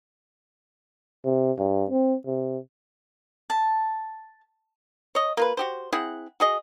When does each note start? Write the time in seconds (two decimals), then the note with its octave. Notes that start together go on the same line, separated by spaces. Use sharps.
1.25 C3
1.58 G2
1.90 C4
2.26 C3
3.50 A5
5.15 C#5 D#5
5.37 A#3 F4 B4
5.57 F#4 G4 C5
5.92 C4 E4 G#4 F#5
6.40 F#4 G#4 D#5